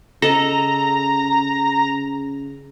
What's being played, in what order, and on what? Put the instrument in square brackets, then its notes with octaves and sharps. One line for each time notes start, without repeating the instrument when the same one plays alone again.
[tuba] C#3 [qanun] A4 D#5 [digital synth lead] A#5